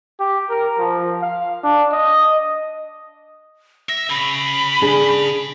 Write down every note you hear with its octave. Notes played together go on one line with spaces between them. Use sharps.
G4
A#4
F3
F5
D4
D#5
E5 A#6
C#3 B5
D4 G#4